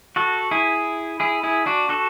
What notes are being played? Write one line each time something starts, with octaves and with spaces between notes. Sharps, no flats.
F#4 A4
E4 G#4
E4 G#4
E4 G#4
D4 F#4
F#4 A4